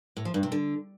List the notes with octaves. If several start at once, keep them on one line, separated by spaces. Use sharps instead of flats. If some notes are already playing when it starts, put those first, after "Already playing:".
A2
F3
G2
C3
D3